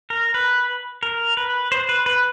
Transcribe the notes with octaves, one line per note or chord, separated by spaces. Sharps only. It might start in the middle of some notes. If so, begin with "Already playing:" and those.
A#4
B4
A#4
B4
C5
B4
B4